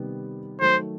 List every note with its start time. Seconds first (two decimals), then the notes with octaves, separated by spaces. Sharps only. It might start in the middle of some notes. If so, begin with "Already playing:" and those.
Already playing: C3 D#3 G3 B3
0.60 D#3 F#3 A3 C5